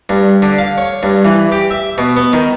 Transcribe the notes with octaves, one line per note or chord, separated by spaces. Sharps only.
G2
D3
F5
C#5
G2
E3
G4
E5
B2
B3
D#3